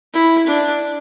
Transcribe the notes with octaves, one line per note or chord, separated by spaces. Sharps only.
E4
D4